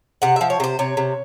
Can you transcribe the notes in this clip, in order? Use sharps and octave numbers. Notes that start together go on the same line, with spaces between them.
C3 F#5
F3 E5
C#5
C3 C5
C3 C#5
C3